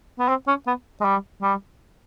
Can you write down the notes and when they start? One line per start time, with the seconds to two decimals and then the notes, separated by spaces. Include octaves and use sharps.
0.19 B3
0.29 C4
0.48 C#4
0.67 B3
1.01 G#3
1.05 G3
1.42 G3